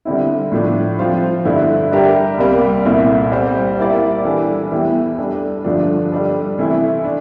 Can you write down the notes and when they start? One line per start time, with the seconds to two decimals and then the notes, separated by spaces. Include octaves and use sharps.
0.05 D3 G3 C4 E4
0.52 A2 F3 A3 D4
0.99 F3 C4 F4 C5
1.45 G2 D3 A3 E4
1.92 G3 D4 G4 A#4 E5
2.38 C2 C3 G3 A#3
2.85 C2 A#2 A3 E4
3.32 G3 C4 G4 C5
3.78 G3 A#3 E4 G4 D5
4.25 E3 G3 D4 A4
4.72 E2 E3 A3 E4 G4
5.18 G3 D4 A4
5.64 G2 D3 F3 A3 D4
6.12 G3 D4 A4
6.58 C3 E3 A3 E4
7.05 D4